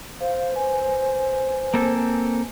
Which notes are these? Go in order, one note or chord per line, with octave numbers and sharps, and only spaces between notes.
C5 F5
B4 G#5
A#3 C4 A4